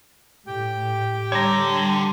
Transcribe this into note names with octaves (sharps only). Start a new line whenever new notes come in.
A2 G4 G5
D3 G3 C#5 A#5